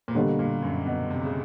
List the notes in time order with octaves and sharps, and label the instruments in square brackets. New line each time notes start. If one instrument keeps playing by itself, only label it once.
[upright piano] A#2
[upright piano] B2 [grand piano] D3 G3 A#3 D4
[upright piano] A#2
F#2
B2
C3
C#3